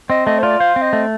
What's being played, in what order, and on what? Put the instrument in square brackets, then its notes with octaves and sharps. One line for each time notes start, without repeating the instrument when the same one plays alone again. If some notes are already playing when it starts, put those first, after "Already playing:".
[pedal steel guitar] C4 [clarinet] D#5
[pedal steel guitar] A3 [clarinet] D#5
[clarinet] C5
[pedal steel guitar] F4 [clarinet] D5
[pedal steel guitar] C5 [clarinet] F5
[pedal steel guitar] C4
[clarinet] D#5
[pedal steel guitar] A3